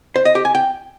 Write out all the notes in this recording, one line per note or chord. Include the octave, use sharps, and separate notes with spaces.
C5
D#5
G4
G#5
G5